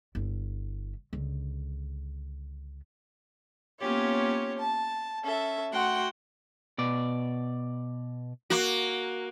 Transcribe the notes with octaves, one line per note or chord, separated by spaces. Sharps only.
G1 E4
C#2 D3
A#3 B3 C#4 F4 G4 C#5
A5
C#4 A4 E5
A3 F#4 F#5 G5 C6
B2 D5
A#3 F#4